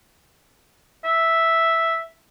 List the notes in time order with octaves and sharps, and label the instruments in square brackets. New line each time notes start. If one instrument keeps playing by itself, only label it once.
[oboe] E5